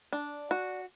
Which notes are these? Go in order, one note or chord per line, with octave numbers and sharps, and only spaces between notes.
D4
F#4